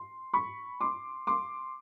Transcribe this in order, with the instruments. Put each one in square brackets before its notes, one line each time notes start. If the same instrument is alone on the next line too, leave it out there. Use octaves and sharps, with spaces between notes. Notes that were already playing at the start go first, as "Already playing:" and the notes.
Already playing: [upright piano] C6
B5 C#6
C6 D6
C6 D6